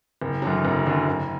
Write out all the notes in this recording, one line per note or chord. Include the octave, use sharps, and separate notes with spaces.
F#1
F#2 D3 F#3
F#1
F#2 D3 F#3
F#1